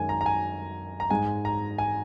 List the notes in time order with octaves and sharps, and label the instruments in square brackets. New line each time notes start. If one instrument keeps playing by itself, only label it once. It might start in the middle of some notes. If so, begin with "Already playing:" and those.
Already playing: [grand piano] F#2 D#3 G#3 G#5
A#5
A#5
G#5
A#5
G#2 G#3 G#5
A#5
G#5